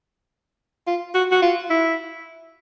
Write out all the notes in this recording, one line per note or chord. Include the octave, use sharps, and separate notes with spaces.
F4
F#4
F#4
F4
E4